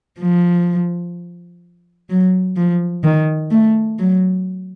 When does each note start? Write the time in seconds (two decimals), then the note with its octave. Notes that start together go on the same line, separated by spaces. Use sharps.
0.19 F3
2.10 F#3
2.56 F3
3.04 D#3
3.51 A3
3.99 F#3